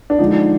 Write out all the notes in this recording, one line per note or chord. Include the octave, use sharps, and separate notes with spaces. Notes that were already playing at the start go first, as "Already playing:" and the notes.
D4
D3 F3 G#3 D#4